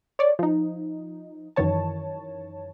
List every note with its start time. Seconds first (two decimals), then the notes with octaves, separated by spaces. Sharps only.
0.19 C#5 D5
0.39 F3 D#4
1.56 F#2 D#3 E3 C#5 A5